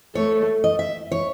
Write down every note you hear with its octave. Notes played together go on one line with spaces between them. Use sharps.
A3 C#5
D#5
E5
C#5